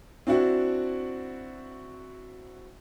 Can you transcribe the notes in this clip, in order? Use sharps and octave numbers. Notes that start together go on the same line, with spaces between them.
C4 D4 E4 F#4